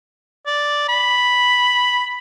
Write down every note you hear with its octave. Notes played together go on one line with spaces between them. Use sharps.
D5
B5